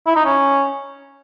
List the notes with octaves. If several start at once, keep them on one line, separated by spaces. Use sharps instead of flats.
E4
D#4
C#4